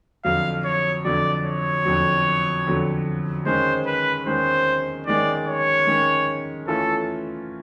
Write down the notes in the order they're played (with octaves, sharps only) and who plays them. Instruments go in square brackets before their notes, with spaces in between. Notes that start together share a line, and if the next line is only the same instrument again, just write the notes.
[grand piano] F2 D3 F#3 [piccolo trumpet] F5
[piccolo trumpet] C#5
[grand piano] F2 D3 F#3 [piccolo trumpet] D5
[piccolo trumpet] C#5
[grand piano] F2 D3 F#3
F2 D3 F#3
[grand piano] D#3 G#3 C#4 [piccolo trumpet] C5
[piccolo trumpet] B4
[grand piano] D#3 G#3 C#4 [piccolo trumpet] C5
[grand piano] D#3 G#3 C#4 [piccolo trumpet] D5
[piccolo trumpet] C#5
[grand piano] D#3 G#3 C#4
[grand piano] E3 A3 C#4 F4 [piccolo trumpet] A4